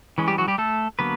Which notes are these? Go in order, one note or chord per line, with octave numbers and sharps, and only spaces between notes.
E3 G#3 C#4
G3 G4
F#3 F#4
G3 G4
A3 A4
D3 F#3 A#3 B3 B4